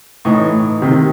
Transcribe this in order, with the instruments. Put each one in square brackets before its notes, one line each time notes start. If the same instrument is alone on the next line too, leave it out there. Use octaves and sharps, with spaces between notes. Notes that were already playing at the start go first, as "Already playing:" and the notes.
[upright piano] A2 E3 D#4
C3 D#3